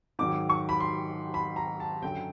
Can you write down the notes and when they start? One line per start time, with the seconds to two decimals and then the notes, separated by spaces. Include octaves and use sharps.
0.19 G#2 D#3 F#3 D6
0.49 C#6
0.69 B5
0.80 C6
1.34 B5
1.56 A#5
1.80 A5
2.02 F#2 D3 F#3 G5